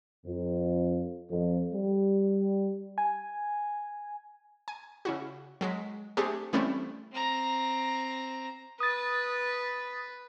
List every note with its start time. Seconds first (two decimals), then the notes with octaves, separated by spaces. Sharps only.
0.26 F2
1.31 F2
1.73 G3
2.98 G#5
4.68 G#5
5.05 C#3 E4 F#4
5.61 F#3 G#3 B6
6.17 A3 C4 D4 G4 G#4
6.53 E3 G3 A3 C4 C#4 E4
7.12 C4 A#5
8.80 B4 D#6 A6